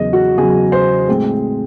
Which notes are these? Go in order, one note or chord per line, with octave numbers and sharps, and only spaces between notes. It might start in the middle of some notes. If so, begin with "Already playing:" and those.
Already playing: E2 C#3 F#3 D#5
F#4
E2 C#3 F#3 G#4
C5
A2 G#3 C4